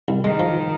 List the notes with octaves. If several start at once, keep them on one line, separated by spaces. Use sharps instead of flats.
C2
D#3 G#3
F3